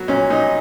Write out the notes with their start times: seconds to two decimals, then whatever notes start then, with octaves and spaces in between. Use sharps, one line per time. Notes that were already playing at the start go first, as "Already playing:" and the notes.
Already playing: F#3 B3
0.08 A#2 C#4
0.30 A#2 D#4